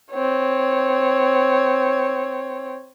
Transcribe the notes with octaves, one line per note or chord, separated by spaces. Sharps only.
C4 C#5